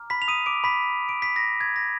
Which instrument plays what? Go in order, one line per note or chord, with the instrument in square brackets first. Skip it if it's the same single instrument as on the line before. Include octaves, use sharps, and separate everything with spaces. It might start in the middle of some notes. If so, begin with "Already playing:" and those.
Already playing: [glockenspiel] A#5 D6 F6
B5 B6
F7
D#6 D#7
D6 D7
B5 B6
D7
B6
A#6
G#6
A#6